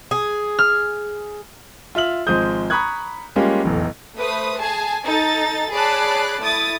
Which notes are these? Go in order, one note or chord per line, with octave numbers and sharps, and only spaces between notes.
G#4
F6
F4 E5 F6 F#7
G#1 F3 G#3 C5 D#6 G6
A#5 B5 C#6 D#6 F#6 G#6
G3 G#3 A#3 C#4 F4 G4
F1 B1 E2 A2 E3
A3 B4 C5 D#6
G#4 G#5 A5
D#4 A4 A6
G#4 C#5 D5 A5 B5 F#6
A3 E4 D#6 A6